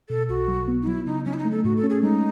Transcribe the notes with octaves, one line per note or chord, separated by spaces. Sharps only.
B2 A4
B1 F#4
F#3
B3
D#4
F#3 E4
C#3 D#4
F#3 C#4
E4
D#4
A3
A4
A2 F#4
A4
C#4
G#4
G#3 D#4